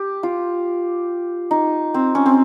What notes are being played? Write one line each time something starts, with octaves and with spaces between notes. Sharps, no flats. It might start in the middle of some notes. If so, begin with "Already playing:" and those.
Already playing: G4
F4
D#4
C4
C#4
C4